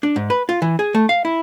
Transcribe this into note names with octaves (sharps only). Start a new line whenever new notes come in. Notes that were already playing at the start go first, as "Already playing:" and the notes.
D4
G#2
B4
F4
E3
G#4
A3
F5
E4